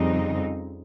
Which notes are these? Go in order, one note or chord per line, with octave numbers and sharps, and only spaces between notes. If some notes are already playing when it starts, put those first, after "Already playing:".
Already playing: F2 C#3 G3 C4 D#4